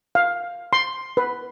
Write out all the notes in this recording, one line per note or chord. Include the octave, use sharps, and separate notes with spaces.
F5
C6
B4